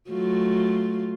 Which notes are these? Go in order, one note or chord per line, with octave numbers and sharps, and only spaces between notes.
F#3 A3 F4